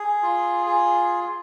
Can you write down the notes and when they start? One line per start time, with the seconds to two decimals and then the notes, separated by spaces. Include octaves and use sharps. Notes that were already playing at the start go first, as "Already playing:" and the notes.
Already playing: G#4
0.23 F4
0.67 G#4